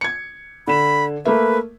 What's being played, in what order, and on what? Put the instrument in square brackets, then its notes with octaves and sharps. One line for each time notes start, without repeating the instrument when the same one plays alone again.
[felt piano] G#6 C#7
[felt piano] D3 E7 [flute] B5
[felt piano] A3 A#3 E5 [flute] B4